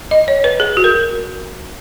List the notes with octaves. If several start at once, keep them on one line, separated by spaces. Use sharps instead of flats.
D#5
C#5
B4
G#4
F#4
A#4